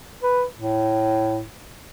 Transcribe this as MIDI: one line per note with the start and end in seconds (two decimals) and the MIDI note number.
0.23 0.44 71
0.56 1.43 45